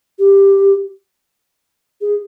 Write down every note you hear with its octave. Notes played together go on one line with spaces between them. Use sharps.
G4
G#4